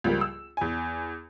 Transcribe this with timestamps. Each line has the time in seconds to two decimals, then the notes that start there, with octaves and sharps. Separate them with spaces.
0.04 C#2 F3 G3 A#3
0.21 E6
0.57 E2 G#5